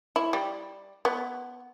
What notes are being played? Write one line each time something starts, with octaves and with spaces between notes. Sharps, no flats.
E4
G3
B3